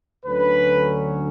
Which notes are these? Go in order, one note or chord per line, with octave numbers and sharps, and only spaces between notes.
D2 D3 F#3 C#4 B4